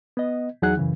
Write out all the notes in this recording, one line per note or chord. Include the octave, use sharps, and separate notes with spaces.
B3 D#5
E2 F#3 D#4 G#4 F#5 F#6
F#2 C#3 E3